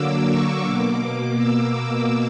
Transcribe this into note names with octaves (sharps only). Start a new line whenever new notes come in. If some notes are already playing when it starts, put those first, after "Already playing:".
Already playing: D3 F#3 A#3 D6 E6
C#6
B2 A#3 D6
E6